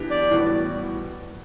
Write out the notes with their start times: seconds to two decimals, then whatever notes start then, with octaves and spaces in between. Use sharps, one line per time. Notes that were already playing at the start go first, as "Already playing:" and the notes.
Already playing: E3 B3 D4 G4
0.11 D5
0.30 A2 E3 G3 B3 F#4